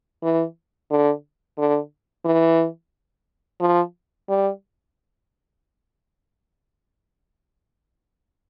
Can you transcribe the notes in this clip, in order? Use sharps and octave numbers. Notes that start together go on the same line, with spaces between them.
E3
D3
D3
E3
F3
G3